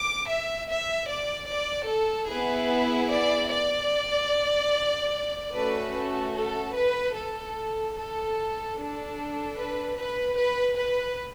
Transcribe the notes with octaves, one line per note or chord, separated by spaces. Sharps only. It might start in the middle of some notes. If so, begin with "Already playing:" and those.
Already playing: D6
E5
E5
D5
D5
A4
B3 E4 G#4 B4
D5
D5
A3 C#4 F#4 A4 B4
A4
A4
B4
A4
A4
D4 A4
B4
B4
B4
B4